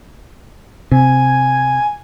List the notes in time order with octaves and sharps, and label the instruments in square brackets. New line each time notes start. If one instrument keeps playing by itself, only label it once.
[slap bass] C3 [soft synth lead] G#5